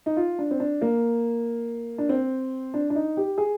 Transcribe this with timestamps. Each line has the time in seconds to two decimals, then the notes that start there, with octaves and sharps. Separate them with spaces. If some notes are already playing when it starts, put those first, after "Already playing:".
0.06 D#4
0.17 F4
0.39 D4
0.51 C4
0.60 D4
0.81 A#3
1.98 D4
2.09 C4
2.74 D4
2.90 D4
2.96 D#4
3.17 G4
3.38 G#4